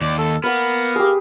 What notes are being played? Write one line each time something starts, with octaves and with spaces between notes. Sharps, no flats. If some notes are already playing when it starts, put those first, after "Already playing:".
D#2 D5
A4
A#3 B3 B4 F#5 F6
G4 G#4